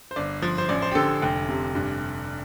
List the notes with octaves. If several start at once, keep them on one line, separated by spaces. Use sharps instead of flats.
C5
G1 D5
F3
C5
A1 D5
C5
G4
D3 A4
F1 G5
C3
G2